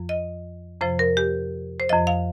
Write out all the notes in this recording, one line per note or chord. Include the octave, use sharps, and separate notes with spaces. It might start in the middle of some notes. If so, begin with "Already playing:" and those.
Already playing: F2 F3
D#5
F2 C3 F3 C5
A#4
G4
C5
F2 F3 D#5
F5